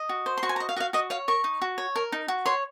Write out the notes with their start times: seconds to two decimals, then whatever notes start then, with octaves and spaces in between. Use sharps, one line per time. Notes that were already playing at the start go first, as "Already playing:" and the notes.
Already playing: D#5
0.09 F#4
0.26 C5
0.38 C6
0.43 F#4 C#6
0.49 G#5
0.56 A#5
0.60 D#5
0.69 F5
0.76 F#4 D#5
0.80 F5
0.93 F#4 D#5
1.10 C#5 F5
1.28 A#4 C#6
1.44 D#4
1.62 F#4
1.78 C#5
1.96 A#4
2.12 D#4
2.28 F#4
2.46 C#5 C6